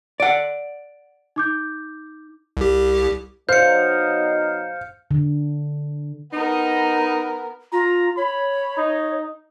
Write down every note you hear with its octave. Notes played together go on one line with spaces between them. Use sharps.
D5 F#5 D7
D#4 D6 G6
C2 G4
B2 F#3 D#4 C5 F5 G6 C#7
D3
B3 D#4 A#4
F4 A#5
C#5 B5
D#4